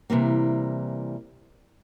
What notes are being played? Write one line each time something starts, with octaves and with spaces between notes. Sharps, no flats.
C3 E3 G3 A#3